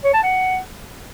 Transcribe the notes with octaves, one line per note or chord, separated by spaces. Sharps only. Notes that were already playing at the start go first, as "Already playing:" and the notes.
C#5
A5
F#5